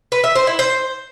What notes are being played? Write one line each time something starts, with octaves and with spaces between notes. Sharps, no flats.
B4
E5
C5
E4
C5